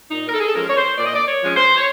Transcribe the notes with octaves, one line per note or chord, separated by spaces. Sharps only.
A#2 D#4
A#4
A4
G#4
A4
F3 G#3 C#4 A#4
C#5
C5
A#2 D5
D#5
D5
C#5
F3 G#3 C#4
C5
C#5